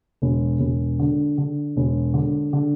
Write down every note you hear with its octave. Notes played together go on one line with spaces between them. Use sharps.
E1
E1
D3
D3
E1
D3
D3